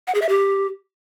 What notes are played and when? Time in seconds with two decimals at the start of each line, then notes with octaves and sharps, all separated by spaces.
0.07 F#5
0.15 G#4
0.22 E5
0.29 G4